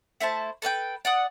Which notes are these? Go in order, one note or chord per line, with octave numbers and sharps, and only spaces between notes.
A3 E4 C5 A5
A4 B4 F5 G5
D5 F#5 D#6